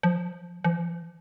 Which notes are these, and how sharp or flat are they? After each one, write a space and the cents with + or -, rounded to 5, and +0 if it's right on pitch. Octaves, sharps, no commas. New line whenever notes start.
F3 +5
F3 -40